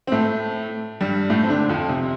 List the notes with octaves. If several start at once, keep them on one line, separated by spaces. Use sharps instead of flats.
C4
A2 A3
G2 G3
A2 A3
C4
D3 D4
D3
F2 F3
C3